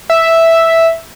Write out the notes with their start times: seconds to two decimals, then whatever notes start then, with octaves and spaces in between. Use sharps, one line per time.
0.10 E5